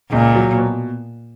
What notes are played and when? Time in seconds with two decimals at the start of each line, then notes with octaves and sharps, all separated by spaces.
0.12 C#2 A#2
0.36 F#3
0.58 B2